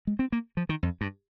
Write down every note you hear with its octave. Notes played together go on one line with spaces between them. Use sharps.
G#3
C4
A#3
F3
D#3
F2
G2